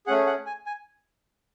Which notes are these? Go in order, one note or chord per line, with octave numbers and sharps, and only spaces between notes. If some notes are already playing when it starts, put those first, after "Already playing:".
A3 C#4 G#4 F#5
F#5
G#5
G#5